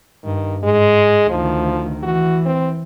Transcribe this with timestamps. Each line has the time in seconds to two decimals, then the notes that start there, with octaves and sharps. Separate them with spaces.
0.24 G2 D#3
0.64 G#2 G#3
1.30 D2 D#3 F3
2.03 E3 F#4
2.46 C4